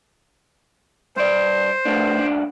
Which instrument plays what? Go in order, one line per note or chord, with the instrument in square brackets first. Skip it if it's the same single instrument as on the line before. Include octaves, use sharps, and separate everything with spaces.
[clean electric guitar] G2 D5 [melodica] C5
[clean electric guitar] A3 B3 D4
C#2 D4